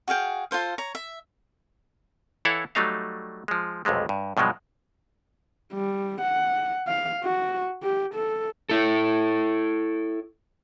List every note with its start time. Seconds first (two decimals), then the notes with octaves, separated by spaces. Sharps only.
0.08 F#4 G#4 F5 G5
0.51 F4 A4 C5 F5
0.78 C#5 A#5
0.95 E5
2.45 E3 E4 A4 C#5 F5 F#5
2.75 F#3 G3 A3 D#4 F5
3.48 F3 G#3
3.85 B1 F2 C3 G#3 A3
4.09 G2
4.37 G2 B2 F3 F#3 G#3
5.73 G3
6.21 F#5
6.88 F5
7.23 F#4
7.83 G4
8.14 A4
8.69 E4 A4